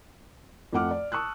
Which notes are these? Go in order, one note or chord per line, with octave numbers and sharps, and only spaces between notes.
F2 A3 F#5 D6 F6
D5
A5 C#6 D#6 E6 F#6